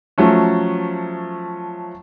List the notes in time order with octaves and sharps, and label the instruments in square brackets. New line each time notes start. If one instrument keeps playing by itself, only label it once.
[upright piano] F3 F#3 A3 C#4